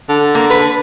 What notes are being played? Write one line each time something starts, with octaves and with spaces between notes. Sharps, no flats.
D3
A#3
B4